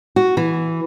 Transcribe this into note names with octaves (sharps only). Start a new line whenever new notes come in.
F#4
E3